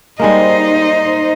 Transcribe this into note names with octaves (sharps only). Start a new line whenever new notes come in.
G3 G#3 A#3 D#4 C5 D#5